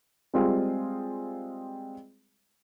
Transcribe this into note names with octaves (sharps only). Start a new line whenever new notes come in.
G3 G#3 C4 F4 G#4